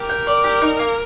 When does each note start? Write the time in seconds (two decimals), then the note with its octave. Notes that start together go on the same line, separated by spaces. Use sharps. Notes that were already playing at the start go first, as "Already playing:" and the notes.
Already playing: G4 A#4
0.10 G5
0.27 D5
0.44 G4
0.62 D#4
0.79 A#3